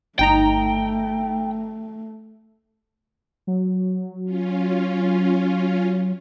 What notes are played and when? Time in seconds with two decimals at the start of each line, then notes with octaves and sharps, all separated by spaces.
0.19 G1 A3 D#4 G5 A#5
3.47 F#3
4.25 C#4 F4